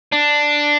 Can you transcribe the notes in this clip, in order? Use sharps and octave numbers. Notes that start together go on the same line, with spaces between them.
D4